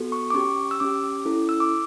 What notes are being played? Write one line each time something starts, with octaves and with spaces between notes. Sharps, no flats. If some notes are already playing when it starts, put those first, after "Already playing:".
Already playing: B3 F#4 A4
C#6
D6
C#4 G4 C#6
E6
C#4 G4 D6
C#4 E4 A4
E6
D6